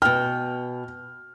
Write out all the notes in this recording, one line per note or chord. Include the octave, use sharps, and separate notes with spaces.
B2 G5 F6